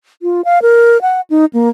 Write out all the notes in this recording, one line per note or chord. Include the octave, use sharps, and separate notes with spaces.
F4
F5
A#4
F#5
D#4
A#3